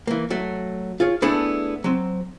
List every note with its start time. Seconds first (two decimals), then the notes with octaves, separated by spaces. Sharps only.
0.07 E3 A#3
0.30 F#3 A3
1.00 F4 G#4 C#5
1.22 A3 B3 D4 E4 G#4 A4
1.84 F#3 C4